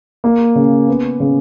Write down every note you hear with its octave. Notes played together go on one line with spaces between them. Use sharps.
A#3
C#3
B3
C#3